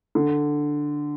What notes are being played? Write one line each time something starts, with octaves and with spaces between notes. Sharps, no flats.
D3